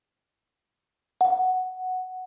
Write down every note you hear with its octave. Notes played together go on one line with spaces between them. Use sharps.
F#5